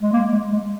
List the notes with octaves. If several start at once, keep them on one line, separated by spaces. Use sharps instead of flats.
G#3
A#3
G#3
G#3